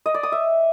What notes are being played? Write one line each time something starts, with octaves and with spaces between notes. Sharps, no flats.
D#5
D5
D#6
E5